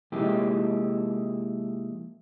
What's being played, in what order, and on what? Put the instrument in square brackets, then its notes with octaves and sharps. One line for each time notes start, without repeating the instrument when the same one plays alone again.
[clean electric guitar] C3 F3 G#3 A#3 E4 G4